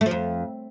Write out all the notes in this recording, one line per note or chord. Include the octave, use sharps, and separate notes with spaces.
A3
F3
F2